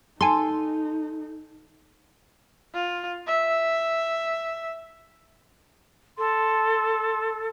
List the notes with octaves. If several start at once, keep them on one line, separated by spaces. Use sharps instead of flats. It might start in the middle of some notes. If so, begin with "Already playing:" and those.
D#4 A4 G#5 C6
F4
E5
A4 C6